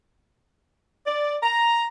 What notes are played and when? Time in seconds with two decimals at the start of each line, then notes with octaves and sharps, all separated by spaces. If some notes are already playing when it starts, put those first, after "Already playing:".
1.06 D5
1.43 A#5